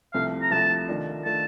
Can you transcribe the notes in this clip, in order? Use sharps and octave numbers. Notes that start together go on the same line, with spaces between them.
C2 C3 F3 A3 F5
A#5
C2 C3 F3 A3 A5
D#3 A3 D4 F4
D#3 A3 D4 F4 A5